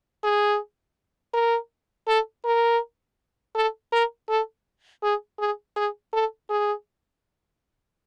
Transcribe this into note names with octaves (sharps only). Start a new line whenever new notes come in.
G#4
A#4
A4
A#4
A4
A#4
A4
G#4
G#4
G#4
A4
G#4